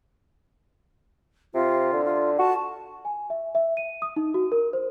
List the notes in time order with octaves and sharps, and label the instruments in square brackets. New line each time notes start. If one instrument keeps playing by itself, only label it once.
[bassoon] C3 [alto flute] F4
[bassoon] D3
[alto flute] F4
[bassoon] F#4 [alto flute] A5
[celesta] G#5
E5
E5
D#7
D#6
D#4
F#4
A#4
C5